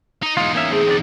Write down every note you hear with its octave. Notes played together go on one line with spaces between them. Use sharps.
D#4 D#5
E2 G#3 D#4 F4
A#3 C#4 E5
A3 C4 G#4
C4 D4 D5